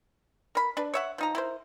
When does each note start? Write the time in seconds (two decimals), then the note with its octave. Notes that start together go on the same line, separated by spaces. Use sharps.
0.55 A#4 B5
0.77 D4 B4
0.94 C#5 E5 F#5
1.18 F3 D#4 A#5
1.35 E4 A#4 C5